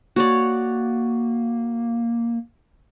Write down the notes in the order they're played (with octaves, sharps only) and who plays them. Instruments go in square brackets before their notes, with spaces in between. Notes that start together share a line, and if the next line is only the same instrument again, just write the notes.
[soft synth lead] A#3 [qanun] F#4 C#5 D5